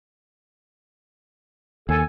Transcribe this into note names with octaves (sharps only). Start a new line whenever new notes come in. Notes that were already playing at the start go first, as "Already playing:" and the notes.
D#2 A4 G#5